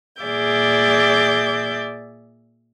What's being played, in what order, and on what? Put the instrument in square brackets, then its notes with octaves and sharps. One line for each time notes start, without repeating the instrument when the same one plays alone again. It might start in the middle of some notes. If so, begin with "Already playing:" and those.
[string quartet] A#2 G#4 D5 E5 D6 G6